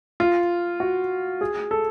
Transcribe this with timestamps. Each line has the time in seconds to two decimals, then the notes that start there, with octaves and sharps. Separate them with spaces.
0.20 F4
0.80 F#4
1.41 G#4
1.71 A4